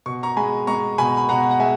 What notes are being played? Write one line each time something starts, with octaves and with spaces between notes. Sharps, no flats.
B2 C#6
A#5 C#6
G#3 G#5 B5
G#3 A#5 C#6
B2 G#5 B5
B5
B2 F#5 A#5
F#5
G#3 E5 G#5